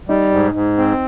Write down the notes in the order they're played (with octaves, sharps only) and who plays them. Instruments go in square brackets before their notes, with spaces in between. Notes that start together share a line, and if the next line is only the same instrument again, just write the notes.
[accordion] G3 [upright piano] D#4
[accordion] G#2
G#2
C4